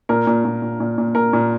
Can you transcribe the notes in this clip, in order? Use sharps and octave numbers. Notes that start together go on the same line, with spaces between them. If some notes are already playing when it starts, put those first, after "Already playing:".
A#2 A#4
A#2
A#2
A#2
A#2
A#2
A#2 A#4
A#2